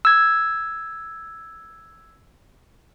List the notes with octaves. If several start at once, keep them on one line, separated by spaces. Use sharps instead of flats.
E6 G#6